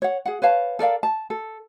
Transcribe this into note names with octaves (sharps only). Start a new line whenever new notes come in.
C#5 F#5
G#4 F#5
B4 C#5 F5 A5
A4 A#4 D5 F5
A5
A4